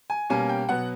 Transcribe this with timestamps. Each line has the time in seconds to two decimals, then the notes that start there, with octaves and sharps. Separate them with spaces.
0.10 G#5
0.30 B2 G3 A#3 C#4 G#5
0.49 G5
0.69 B2 F#3 B3 F#5